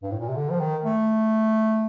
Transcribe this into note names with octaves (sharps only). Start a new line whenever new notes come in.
G2
A2
A#2
C3
D3
F3
D#3
A3